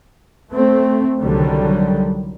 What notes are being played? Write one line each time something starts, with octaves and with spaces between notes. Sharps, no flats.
A3 C4
C2 D3 D#3 F#3 G3